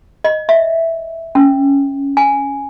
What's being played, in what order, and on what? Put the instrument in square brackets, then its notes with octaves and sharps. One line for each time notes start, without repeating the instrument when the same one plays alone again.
[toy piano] D#5
E5
C#4
G#5